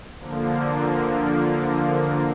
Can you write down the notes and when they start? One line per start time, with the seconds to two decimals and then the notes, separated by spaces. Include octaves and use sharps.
0.18 D3 F3 A#3